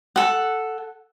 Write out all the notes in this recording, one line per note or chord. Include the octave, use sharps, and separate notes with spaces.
A4 F#5